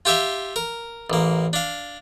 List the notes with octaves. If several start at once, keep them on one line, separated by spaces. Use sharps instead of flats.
F4 G4 E5 F5
A#4
A1 A#3
D4 F5